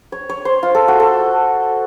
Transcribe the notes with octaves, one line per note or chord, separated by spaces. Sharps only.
C#5
C#5
C5
F4
A4
F#4
A4